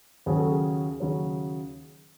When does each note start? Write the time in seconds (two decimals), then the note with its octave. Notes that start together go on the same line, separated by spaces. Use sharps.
0.26 D#2 C#3 F#3 C#4 G#4
0.37 A4
0.50 G#4
1.00 D#2 C#3 F#3 C#4